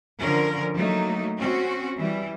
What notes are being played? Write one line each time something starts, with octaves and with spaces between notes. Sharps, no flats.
D3 F3 C#4 A#4
F#3 A3 A#3 D#4
C4 C#4 F#4
E3 G3